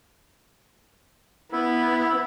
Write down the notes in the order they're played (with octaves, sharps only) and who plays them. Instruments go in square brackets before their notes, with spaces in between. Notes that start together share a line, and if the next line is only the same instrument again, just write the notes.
[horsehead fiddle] B3 [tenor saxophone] E4